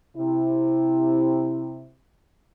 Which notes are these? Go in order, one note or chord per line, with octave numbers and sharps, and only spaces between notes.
C3 E4